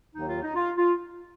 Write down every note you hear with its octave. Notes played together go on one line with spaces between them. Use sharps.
D#2 D#3 F#3 D#4
F4
D#4
F4
F4